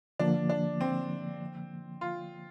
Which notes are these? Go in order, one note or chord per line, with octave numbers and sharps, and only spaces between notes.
D3 F3 A#3 D4
D4
C4
F4